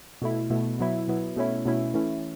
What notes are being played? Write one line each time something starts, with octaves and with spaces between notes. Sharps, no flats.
B2 A3 E4
B2 A3 E4
B2 F#3 B3 E4
B2 F#3 B3 E4
B2 A3 C#4 E4
B2 A3 C#4 E4
E3 A3 C#4 E4